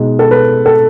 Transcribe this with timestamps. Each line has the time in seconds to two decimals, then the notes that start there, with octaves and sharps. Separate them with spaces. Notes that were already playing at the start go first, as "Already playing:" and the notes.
Already playing: B2 G#3 D#4
0.19 A4
0.31 B4
0.66 A4